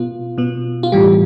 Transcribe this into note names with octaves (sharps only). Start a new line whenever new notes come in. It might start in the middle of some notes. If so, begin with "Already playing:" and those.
Already playing: B2 B3 F4
B2 B3
F4
A2 E3 G3 G4